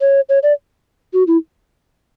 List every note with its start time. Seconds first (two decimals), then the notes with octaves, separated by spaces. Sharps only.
0.01 C#5
0.29 C#5
0.43 D5
1.13 F#4
1.27 E4